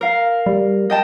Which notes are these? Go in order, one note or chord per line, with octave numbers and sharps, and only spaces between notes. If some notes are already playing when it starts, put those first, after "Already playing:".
A#4 F5
G3
D#5 G5 A5